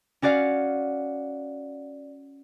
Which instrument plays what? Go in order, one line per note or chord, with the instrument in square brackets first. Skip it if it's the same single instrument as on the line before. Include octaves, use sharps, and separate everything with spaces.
[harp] C#4 F#4 D5 F5 F#5